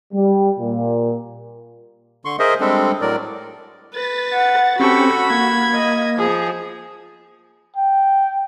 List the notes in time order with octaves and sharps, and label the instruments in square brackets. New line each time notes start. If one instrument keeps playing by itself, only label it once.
[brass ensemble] G3
A#2
[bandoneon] D3 C6 C#6
G#4 A#4 C5 D#5 E5
G3 G#3 C4 D4 A4
A2 F#3 A#4 D5
[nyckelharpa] B4 [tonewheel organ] A6
[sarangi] F#5
[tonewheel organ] C4 C#4 G4 [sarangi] F#4 [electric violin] A4 C#6 [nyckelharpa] B5
[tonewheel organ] A#3 [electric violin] G#6
[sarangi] D#5
[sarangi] F3 [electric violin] G#4
[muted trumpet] G5